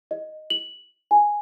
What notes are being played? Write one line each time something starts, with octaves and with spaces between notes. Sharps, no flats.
D#5
F#7
G#5